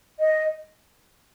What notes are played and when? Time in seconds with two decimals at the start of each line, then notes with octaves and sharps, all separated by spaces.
0.19 D#5